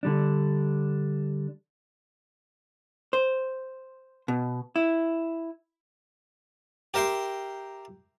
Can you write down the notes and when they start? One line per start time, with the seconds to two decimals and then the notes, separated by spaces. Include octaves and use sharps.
0.03 D3 G3 D4
3.13 C5
4.28 B2
4.76 E4
6.94 G4 A#4 E5 G5 C6